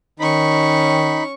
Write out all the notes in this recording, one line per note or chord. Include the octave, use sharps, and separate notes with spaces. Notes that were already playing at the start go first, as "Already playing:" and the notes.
D#3 C#4 D#4 B5 C#6